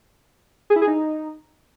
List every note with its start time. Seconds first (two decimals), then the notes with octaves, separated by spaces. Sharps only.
0.70 G#4
0.76 E4
0.82 G#4
0.87 D#4